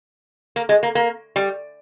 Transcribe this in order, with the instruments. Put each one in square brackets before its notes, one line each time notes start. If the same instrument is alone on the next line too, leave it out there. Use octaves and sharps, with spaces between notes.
[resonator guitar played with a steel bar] A#3
G#3
A#3
A#3
G3